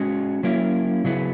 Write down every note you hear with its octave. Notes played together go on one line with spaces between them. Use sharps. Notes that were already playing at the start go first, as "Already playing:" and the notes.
Already playing: G#3 C#4 F#4
F#3 A#3 C#4 E4
C#3 F#3 B3 E4 G#4